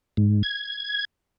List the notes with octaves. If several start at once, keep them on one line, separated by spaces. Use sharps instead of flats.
G#2
G#6